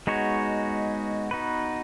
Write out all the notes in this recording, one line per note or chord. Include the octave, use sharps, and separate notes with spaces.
G#3 B3 D#4 F#4 C#5
B3 D#4 F#4 B4